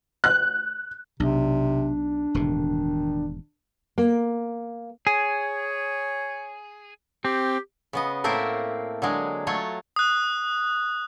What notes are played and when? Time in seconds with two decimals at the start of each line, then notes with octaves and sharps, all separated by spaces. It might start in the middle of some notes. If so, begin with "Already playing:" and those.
0.24 F#6
1.20 B1 C3 D4
2.34 E1 A2 C3 D#3
3.98 A#3
5.07 G#4 C#5
7.25 C4 G4
7.93 C#3 B3 D#5
8.24 A2 A3 A#3 C4 A#4 E5
9.02 D3 F#3 G#3
9.47 F#3 A3 F4 C#5
9.96 D#6 F#6